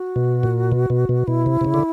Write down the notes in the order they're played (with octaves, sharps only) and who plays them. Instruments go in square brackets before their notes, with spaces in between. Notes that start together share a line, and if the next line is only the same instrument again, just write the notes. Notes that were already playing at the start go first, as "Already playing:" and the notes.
Already playing: [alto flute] F#4
[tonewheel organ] B2
A#2
B2
B2
B2
[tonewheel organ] B2 [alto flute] E4
[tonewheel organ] C3
C3
C#3
D3